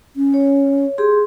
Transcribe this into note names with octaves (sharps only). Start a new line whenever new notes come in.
C#4
C#5
G4 G#4 C6